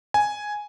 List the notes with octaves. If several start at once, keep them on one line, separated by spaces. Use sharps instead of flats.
G#5